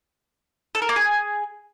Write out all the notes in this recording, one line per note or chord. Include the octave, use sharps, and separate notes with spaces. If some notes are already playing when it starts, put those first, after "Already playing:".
A4
A#4
A#3
G#4